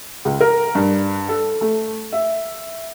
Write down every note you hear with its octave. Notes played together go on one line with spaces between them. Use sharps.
C#2
A#4
G2
A4
A3
E5